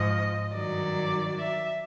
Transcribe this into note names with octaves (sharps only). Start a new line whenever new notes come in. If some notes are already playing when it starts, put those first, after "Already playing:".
Already playing: G#2 F3 D#5
G2 D#3 F#3 D5
E5